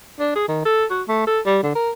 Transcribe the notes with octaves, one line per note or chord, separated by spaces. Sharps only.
D4
G#4
D#3
A4
F#4
A3
A4
G3
D3
A#4